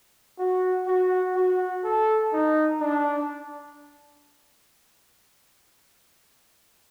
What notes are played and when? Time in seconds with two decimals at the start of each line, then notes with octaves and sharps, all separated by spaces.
0.39 F#4
0.87 F#4
1.35 F#4
1.84 A4
2.33 D#4
2.80 D4